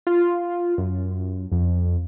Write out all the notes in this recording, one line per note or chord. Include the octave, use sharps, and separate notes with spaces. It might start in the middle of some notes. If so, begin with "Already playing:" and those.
F4
F#2
F2